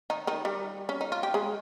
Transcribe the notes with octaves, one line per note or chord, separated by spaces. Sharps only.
D#3 D#4
D#3 D#4
G3 G4
C#4
D#4
F4
G4
G#3 G#4